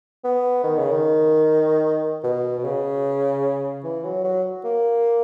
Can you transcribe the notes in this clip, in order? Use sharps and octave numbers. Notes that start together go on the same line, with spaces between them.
B3
D#3
C#3
D#3
B2
B2
C#3
E3
F#3
F#3
A#3